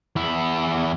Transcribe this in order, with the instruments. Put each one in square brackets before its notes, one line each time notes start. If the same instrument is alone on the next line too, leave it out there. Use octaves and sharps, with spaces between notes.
[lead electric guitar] E2 E4